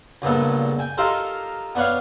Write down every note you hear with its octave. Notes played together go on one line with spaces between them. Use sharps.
C#2 G2 A#2 B3 A4
G5 G#5
D#4 F4 G4 A4 A#4 C5
B3 D4 B4 C#5 F5